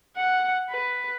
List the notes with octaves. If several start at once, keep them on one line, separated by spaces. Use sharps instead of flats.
F#5
B4